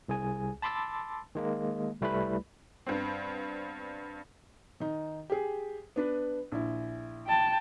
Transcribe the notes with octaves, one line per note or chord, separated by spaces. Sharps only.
C2 G#4 G#5
A5 B5 C6 D6 E6 A6
D#3 G#3 A#3
C2 G3 A3 E4 B4 B5
G2 B3 C4
D#3 D#4
G4 G#4
B3 D4 B4
A#1 E4
G5 A5